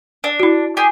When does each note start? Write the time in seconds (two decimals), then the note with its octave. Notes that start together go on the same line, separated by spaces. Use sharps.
0.24 D4
0.40 E4 F#4
0.77 G4 G#4